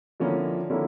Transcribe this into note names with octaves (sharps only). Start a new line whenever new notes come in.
D3 F3 A#3 C#4 E4
D3 F3 A#3 C#4 E4